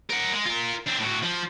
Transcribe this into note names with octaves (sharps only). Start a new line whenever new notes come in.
A#4 F#5
G#3
F4 A#4
C4 D4
A2 F#4
F3